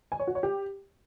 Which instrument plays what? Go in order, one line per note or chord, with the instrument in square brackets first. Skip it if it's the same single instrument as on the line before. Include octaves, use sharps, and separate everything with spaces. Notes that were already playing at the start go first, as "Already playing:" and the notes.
[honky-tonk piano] G#5
C#5
F#4
C#5
G4